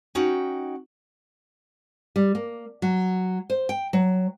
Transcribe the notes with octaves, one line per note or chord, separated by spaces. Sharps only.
C#4 D#4 F#4 G5
G3
A#3
F#3
C5
G5
F#3